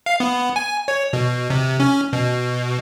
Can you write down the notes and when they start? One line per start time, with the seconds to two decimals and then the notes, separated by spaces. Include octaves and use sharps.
0.06 F5
0.20 B3
0.56 G#5
0.88 C#5
1.13 B2
1.50 C3
1.80 C#4
2.13 B2